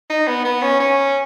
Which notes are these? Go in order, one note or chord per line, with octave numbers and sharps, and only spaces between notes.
D#4
B3
B3
C#4
C#4